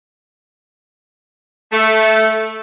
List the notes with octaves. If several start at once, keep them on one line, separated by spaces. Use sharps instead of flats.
A3